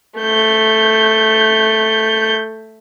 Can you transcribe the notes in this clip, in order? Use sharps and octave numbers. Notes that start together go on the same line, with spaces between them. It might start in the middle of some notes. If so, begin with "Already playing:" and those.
A3 G6